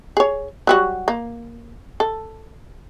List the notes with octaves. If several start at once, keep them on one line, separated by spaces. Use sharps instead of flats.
G#4 C#5
F#3 G3 F#4
A#3
A4